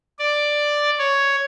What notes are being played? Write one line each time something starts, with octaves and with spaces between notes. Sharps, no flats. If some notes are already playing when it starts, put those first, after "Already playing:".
D5
C#5